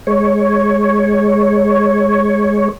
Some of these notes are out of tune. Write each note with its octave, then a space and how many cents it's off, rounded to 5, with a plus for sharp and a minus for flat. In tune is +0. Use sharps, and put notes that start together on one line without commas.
G#3 +0 C#5 +0